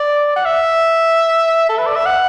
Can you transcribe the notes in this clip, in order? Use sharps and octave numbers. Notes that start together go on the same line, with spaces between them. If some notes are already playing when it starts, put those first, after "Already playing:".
Already playing: D5
F#5
E5
A4
B4
D5
E5
F#5